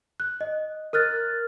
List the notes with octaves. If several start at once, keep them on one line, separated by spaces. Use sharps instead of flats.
F#6
D#5
A#4 F6 F#6 A6